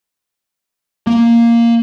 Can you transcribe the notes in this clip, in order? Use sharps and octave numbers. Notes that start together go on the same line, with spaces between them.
A#3